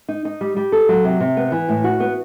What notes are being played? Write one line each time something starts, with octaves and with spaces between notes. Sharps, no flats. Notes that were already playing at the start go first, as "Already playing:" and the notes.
D#4
D#4
G3
G3
A4
F#3
C3
C3
B3
E3
A2
F#4
B3